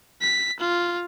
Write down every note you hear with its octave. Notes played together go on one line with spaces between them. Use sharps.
B6
F4